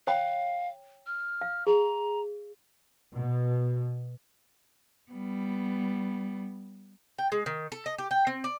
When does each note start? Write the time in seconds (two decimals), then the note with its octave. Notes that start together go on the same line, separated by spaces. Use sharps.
0.07 C#5 F5 G5 B5
1.07 F6
1.41 F5
1.67 G#4 A#5
3.15 B2
5.12 G3 B3
7.18 G5
7.32 G#3
7.46 D#3
7.72 A4
7.86 D#5
7.98 G4
8.11 G5
8.27 C4
8.44 D5